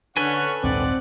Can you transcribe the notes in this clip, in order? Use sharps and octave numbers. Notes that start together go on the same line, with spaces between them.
D3 C#4 A4 B4 C#5 F#5 G#5
A#1 D#2 G#2 C4 D5 F#5